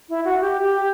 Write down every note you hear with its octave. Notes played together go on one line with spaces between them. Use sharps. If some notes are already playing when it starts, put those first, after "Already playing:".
E4
F#4
G4
G4